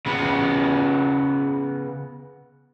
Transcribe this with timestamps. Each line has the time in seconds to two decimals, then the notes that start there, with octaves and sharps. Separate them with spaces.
0.06 C#3 B3